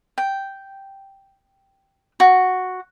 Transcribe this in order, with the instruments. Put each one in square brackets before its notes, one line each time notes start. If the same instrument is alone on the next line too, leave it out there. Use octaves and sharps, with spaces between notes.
[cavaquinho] G5
F#4